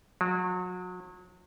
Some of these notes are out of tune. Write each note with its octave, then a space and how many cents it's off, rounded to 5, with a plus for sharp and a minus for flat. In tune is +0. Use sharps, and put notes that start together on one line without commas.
F#3 -35